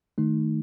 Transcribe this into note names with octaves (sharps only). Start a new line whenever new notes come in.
D#3 A3 D#4